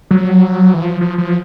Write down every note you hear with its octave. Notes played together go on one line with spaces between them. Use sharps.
F#3
E3
F3
F3
F3